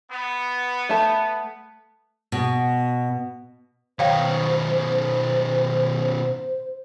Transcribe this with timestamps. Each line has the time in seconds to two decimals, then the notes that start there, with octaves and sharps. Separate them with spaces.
0.12 B3
0.89 A3 A5
2.32 B2
3.99 B2 D#3 C5 C#5 F5 G5